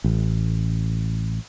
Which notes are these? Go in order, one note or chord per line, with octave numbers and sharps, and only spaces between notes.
A1